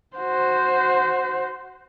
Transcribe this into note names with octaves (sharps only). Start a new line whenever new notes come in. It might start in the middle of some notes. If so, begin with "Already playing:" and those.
F#4 C5